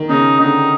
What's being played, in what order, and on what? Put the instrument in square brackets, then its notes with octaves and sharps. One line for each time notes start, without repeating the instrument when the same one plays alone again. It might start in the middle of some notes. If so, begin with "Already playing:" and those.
Already playing: [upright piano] D#3
[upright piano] C#3 [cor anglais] D#4
[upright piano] D3 [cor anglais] D#4